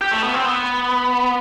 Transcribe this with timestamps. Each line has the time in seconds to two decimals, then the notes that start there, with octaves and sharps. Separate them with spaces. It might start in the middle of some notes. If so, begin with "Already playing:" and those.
0.01 G4
0.11 A3
0.23 B3
0.34 C4
0.45 B3